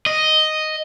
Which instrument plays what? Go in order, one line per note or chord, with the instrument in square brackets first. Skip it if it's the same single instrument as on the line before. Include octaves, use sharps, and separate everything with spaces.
[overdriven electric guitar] D#5